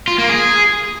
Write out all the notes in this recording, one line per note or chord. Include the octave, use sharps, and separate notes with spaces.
F4
A#3
G#4